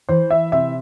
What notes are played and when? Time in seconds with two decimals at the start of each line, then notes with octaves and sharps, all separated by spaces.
0.09 E3 C5
0.31 E5
0.52 C3 E5